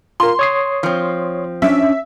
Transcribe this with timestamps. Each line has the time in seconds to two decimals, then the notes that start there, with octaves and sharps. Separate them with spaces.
0.20 F4 A#4 C6
0.39 C#5 D#6 C7
0.83 F3 C4
1.62 C#4 D4 E5